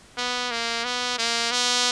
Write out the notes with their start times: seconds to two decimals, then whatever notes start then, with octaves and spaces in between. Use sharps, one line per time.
0.18 B3
0.51 A#3
0.85 B3
1.18 A#3
1.51 B3